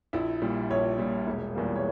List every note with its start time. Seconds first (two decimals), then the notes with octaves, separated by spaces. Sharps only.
0.13 A#1 E4 E5
0.42 A#2 G3
0.70 A#1 C#5
0.98 A#2 G3
1.27 E1
1.55 E2 E3 G3 A#3
1.75 C#5